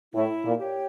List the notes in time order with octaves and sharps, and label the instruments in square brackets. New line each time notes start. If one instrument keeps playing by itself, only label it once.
[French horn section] A2 [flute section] E4
[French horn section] A#2
[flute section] G4 C#5 G5